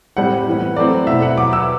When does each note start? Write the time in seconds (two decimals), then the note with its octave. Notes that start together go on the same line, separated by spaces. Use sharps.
0.17 A2 G3 C4 E4 F#5
0.47 A2 E3 B3
0.76 F#3 A3 C4 E4 D5
1.07 B2 A3 E4 E5
1.22 F#5
1.37 F#3 B3 E4 D6
1.53 E6